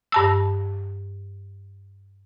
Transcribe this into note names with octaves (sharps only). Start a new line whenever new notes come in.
G2 A5 E6